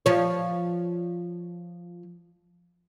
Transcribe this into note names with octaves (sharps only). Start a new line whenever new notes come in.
F3 C#5